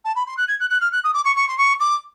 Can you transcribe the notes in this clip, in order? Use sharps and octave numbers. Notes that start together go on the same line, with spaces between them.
A5
B5
C6
F#6
G#6
F#6
F#6
F6
F#6
D#6
D6
C#6
C#6
C6
C#6
D6